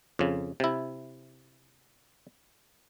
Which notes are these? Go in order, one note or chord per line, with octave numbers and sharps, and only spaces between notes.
F2 C#3
C3 E4